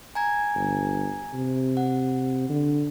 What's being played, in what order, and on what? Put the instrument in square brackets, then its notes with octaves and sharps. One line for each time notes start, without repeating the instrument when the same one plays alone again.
[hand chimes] G#5 A#5 G#6
[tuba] G1
C3
[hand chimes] F#5
[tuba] D3